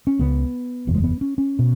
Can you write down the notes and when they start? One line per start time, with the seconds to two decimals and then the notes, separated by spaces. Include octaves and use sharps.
0.07 C#4
0.19 C#2 C#3 B3
0.87 F#1 E2 B2
0.95 G#3
1.04 B3
1.21 C#4
1.38 C#4
1.59 B2